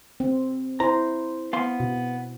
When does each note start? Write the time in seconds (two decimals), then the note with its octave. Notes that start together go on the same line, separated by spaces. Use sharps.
0.20 C4
0.80 E4 C5 A#5
1.53 B3 F5 C6
1.80 B2